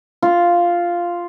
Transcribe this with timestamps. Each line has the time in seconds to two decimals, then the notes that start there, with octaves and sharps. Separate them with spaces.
0.22 F4